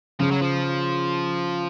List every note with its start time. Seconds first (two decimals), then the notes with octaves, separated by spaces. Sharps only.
0.20 C#3 F3
0.31 F#3
0.42 F3